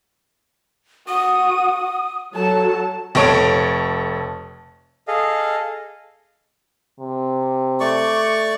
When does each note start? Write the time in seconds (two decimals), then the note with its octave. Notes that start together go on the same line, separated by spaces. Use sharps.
1.08 F#4 D#6
2.35 F#3 A4 A5
3.15 F1 A4 C#5 D7
5.08 G#4 A4 D#5 F5
7.00 C3
7.80 A3 D5 C#6